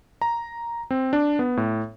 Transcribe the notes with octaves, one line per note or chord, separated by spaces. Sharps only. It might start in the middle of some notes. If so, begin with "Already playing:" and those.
A#5
C4
D4
B3
A2